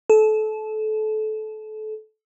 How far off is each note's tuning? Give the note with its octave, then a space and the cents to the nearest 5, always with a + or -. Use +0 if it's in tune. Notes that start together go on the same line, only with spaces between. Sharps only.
A4 -25